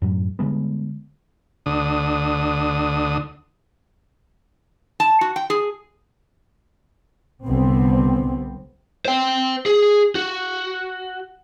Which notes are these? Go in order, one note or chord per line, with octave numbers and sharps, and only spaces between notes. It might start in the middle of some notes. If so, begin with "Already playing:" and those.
F#2 A2 F#3
D3 G3 G#3 B3
D2 D3 D#6
A5
F#4
G5
G#4
C2 D3 B3 C4
C5 G5
G#4
F#4